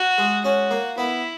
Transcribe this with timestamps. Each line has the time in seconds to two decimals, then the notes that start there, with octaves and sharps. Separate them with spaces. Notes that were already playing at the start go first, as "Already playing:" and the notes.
Already playing: F#4
0.18 G#3
0.45 C#4 F#4
0.71 A#3
0.97 B3 E4